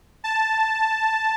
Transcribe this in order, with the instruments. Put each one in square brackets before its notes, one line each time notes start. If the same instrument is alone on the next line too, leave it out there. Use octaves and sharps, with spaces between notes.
[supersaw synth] A5